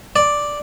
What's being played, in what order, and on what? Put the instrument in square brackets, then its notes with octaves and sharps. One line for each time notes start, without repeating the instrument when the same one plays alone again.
[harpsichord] D5